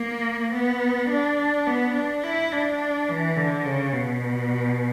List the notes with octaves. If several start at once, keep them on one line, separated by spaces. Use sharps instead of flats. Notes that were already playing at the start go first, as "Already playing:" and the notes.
Already playing: A#3
B3
D4
B3
D4
E4
D4
E3
D3
C#3
B2